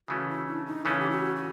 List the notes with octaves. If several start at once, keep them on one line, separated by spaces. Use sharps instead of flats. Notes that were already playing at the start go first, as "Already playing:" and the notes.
C#3 E3 A3 C#4 F#4
E4
D4
D#4
C#3 E3 A3 C#4 E4
G4
F#4
F#4